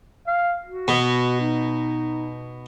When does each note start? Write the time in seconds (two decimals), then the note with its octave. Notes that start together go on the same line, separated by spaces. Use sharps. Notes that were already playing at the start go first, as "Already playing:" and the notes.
0.27 F5
0.66 F#4
0.88 B2
1.40 D#4